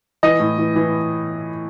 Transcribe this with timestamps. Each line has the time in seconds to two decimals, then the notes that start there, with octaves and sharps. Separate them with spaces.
0.23 E3 D#5
0.40 A2
0.58 E3
0.76 E3